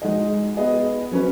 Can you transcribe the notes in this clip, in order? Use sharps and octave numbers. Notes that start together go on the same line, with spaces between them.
G#3 D#4 F#4 D#5
B3 G#4 D#5
F#3 C#4 B4